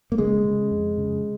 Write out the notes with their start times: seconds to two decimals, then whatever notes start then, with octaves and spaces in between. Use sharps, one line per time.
0.12 A#3
0.18 C#3 G#3
0.44 C#3
0.71 F2
0.98 C#3